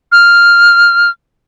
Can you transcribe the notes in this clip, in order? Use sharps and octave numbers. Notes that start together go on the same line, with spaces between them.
F6